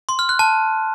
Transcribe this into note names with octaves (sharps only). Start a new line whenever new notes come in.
C6
F6
F#6
A5